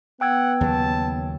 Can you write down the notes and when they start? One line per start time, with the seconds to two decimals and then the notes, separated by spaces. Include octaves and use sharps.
0.21 B3 F#5 G5 E6 G#6
0.61 D#2 C#3 F#3 A5